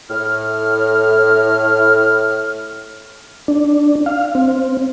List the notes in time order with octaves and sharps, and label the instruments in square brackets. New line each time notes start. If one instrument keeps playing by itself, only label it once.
[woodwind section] A2 F6
[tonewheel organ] D4
F5
C4